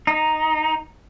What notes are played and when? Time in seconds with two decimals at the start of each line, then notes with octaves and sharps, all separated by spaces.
0.07 D#4